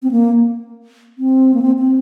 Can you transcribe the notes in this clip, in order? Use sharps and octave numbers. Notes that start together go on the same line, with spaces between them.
C4
A#3
C4
A#3
C4
C4